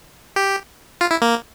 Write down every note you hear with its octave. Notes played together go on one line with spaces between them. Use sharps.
G4
F4
E4
A#3